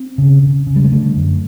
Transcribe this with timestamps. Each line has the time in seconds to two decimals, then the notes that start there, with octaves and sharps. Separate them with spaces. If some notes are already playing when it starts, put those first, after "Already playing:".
Already playing: C4
0.18 C#3
0.43 C#3
0.67 C#3
0.76 G3
0.84 G#3
0.92 D3 A3
1.16 F#2